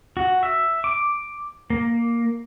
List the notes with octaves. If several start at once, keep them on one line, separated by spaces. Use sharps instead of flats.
F#4
E5
D6
A#3